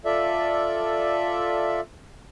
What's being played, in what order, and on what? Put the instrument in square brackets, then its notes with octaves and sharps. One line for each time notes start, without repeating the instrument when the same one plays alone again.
[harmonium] F4 A4 D5 E5